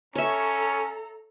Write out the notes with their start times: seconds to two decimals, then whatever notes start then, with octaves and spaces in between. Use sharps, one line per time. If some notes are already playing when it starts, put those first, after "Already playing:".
0.15 C#4 A4 C#5 E5 A#5